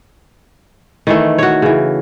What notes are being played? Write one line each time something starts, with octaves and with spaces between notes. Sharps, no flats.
D#3 E3 A3
F#4 C#5
C#3 E3